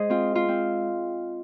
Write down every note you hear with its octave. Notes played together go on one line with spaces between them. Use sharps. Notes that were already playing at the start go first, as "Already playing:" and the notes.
Already playing: G#3 G#4 C5 D#5
C4 F4
F4
C4